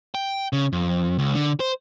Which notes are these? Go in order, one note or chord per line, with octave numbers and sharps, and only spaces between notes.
G5
C#3
F2
C#2
D3
C5